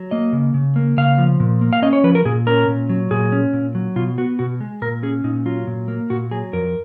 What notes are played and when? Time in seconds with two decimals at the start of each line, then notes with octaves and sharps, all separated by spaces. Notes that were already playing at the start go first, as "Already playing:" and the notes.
Already playing: F#3
0.11 A#3 D#5
0.33 C#3
0.54 C#3
0.76 A#3
0.97 C#3 F5
1.18 F3
1.40 A#2
1.61 A#3
1.73 F5
1.82 C#4 D#5
1.93 C#5
2.04 F3 B4
2.15 A#4
2.25 A#2 G#4
2.47 C#4 A#4
2.68 A#2
2.89 F#3
3.11 A#2 G#4
3.32 C#4
3.53 A#2
3.75 F#3
3.96 B2 F4
4.18 B3 F#4
4.39 B2 F#4
4.61 G#3
4.82 A#2 A#4
5.03 C#4 G#4
5.24 A#2 D#4
5.46 F#3 F4
5.67 A#2
5.88 A#3
6.10 A#2 F#4
6.31 F#3 G#4
6.53 F2 A#4